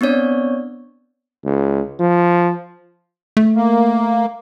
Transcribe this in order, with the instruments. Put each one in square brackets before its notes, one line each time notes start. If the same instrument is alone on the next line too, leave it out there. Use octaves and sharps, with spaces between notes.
[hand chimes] B3 C4 D4 C#5 D5
[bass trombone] C#2
F3
[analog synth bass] A3
[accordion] A#3